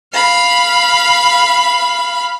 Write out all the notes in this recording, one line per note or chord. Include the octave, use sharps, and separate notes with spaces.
F5 B5